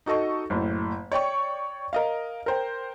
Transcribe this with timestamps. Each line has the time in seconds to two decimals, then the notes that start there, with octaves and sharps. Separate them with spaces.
0.06 D#4 F#4 A4 D#5 C#6
0.50 F#1 A2
1.12 C#5 D5 G5 C#6
1.93 A#4 D#5 F5
2.46 A#4 C5 G5